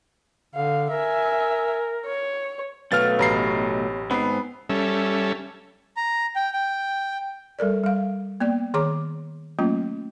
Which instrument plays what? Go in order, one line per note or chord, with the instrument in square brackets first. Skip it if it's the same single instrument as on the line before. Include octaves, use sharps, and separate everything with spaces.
[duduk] D3 [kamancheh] F5
[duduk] A#4 [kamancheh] E5 G#5
[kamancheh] C#5
[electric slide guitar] B2 F#3 A3 [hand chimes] A4 B4 F5 [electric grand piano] F6 A6
[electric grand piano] A1 A#5 C7 [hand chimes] G4 C#5 B5
[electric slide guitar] G#2 C4 [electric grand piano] B3 [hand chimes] B5 C7
[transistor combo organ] G3 C#4 A4 E5
[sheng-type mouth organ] A#5
G5
G5
[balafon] G3 A4 A#4 D5
G3 F5
A#3 B3 D5 G5
D#3 G#4 C#5 A#5 D6
F#3 A3 A#3 C#4 F4